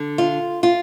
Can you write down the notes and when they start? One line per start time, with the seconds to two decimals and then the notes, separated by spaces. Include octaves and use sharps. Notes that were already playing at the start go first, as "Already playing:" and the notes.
Already playing: D3
0.18 F4
0.63 F4